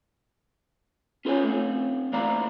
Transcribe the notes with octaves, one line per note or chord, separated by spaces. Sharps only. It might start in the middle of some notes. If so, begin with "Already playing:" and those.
C#4 F4 A4 B4 C#5 G#5
A3 C4
E3 A#3 D5 F5 A#5